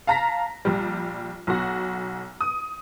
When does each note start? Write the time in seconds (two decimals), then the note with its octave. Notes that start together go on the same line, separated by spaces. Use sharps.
0.07 F5 A5 A#5 A#6 B6
0.65 A#1 G3
1.47 B1 F#4
2.41 D#6